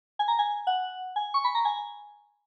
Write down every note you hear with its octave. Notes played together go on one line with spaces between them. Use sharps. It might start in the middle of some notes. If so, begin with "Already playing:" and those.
G#5
A#5
G#5
F#5
G#5
C#6
B5
A#5
G#5